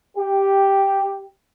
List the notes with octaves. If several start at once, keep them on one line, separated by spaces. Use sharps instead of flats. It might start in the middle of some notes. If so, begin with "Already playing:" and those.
G4